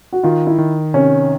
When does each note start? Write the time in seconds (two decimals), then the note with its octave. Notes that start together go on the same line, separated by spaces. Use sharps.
0.13 F#4
0.23 D#3 F4
0.47 E4
0.58 D#3
0.94 C3 C#4